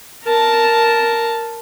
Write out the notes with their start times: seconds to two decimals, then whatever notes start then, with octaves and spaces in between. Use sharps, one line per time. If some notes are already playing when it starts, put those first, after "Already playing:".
0.24 A#4 A5